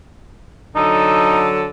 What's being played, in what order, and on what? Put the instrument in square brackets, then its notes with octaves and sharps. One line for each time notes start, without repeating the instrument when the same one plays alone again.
[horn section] D3 F#3 A4 [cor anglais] D#4